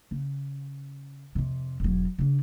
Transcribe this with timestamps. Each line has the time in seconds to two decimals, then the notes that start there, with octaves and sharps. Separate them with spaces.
0.11 C#3
1.35 F2 C3
1.80 E1 F#3
2.18 C#3 D4